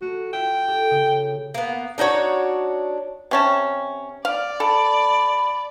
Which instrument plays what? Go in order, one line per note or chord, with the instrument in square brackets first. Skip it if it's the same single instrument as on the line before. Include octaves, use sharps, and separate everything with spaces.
[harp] A3 [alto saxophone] F#4
[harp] F4 E5 [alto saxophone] G5
[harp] G4 A4
C#3
[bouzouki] A#3 B3
D4 D#4 F#4 C#5
[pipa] C3 C#4 A5
[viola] D5 [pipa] F5
[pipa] A4 [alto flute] B5